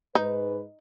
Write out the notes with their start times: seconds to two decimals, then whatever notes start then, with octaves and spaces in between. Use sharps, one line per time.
0.15 G#2 D#4 B4